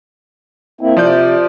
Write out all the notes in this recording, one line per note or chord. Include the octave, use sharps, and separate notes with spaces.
A#3 C4 E4
C3 F3 D5 G6